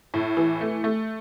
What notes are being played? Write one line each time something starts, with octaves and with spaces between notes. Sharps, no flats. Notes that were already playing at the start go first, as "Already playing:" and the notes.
A2
E3
A3
A3